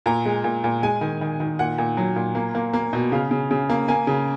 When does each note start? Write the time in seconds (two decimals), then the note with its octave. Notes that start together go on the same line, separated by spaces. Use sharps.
0.06 A#2 A#5
0.25 G#3
0.44 A#2
0.64 A#2
0.83 G#3 G#5
1.01 D#3
1.21 D#3
1.40 D#3
1.59 A#2 F#5
1.78 A#2
1.97 F#3
2.16 A#2
2.35 A#3
2.55 A#3
2.73 A#3
2.93 B2
3.12 C#3 F5
3.31 C#3
3.51 C#3
3.69 A#3
3.88 A#3 G#5
4.07 C#3